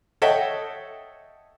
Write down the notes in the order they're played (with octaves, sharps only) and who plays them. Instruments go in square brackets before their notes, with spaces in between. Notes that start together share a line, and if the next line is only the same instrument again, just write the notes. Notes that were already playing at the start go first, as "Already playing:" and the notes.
[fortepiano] A4 C#5 D#5 E5 F#5 G5